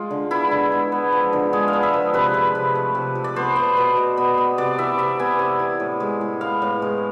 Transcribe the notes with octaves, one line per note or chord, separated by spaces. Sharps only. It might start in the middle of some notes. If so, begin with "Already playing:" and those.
Already playing: G#3 F4
D3
B3 E4
D3
G#3
B3
F3
D3
G#3 G#4
F5
B3
E5
F3
C3 B4
F3
C3
A3
C3
F3
D5
B3 C5
B3
B2
B2
B3
B3
C3 D5
E3 E5
C3 E5
B3 G#5
C3
E3
A2
G#3
A2
B3 F5
A2
G#3